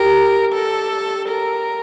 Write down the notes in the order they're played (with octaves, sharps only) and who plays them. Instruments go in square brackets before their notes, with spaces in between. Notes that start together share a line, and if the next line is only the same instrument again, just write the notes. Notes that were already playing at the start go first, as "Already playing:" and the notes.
Already playing: [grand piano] G4 [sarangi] A#4
[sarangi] A4
A#4